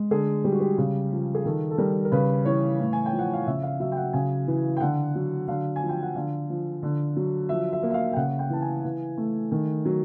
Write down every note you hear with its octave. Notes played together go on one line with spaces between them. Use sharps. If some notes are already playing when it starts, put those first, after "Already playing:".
Already playing: G#3
D3 G#4
G3 G4
F#4
G4
C#3 G4
F3
G#4
D#3 A4
A4
G3 A#4
A#4
C#3 B4
E3 C#5
A2
G#5
G5
F3
F#5
F5
C#3 E5
F5
F#3 E5
G5
F#5
C#3 G#5
E3
G5
D3 F#5
F#3
D3 F5
G#5
F3
G5
F#5
D3 F5
F3
D3
F#3
F3 E5
E5
A#3
E5
F5
G5
C#3 F#5
G5
E3 A5
G#5
E3
A3
D#3
F#3